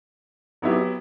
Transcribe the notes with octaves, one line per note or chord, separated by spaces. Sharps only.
F#3 B3 E4 G4